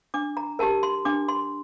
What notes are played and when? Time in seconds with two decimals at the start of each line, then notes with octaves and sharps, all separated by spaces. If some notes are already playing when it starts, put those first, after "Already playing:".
0.14 D4 D6
0.37 A#5
0.59 G4 A#4 A5
0.83 C6
1.05 D4 D6
1.28 C6